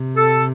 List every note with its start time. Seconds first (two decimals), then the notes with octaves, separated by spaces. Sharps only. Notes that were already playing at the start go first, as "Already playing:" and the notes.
Already playing: C3
0.17 A4